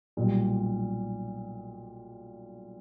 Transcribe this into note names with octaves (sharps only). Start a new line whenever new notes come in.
B1 A#2 G3